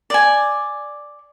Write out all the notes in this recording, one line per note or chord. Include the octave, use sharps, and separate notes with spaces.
D5 G#5